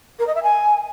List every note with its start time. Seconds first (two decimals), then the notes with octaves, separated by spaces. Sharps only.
0.19 A#4
0.27 D#5
0.35 E5
0.43 G#5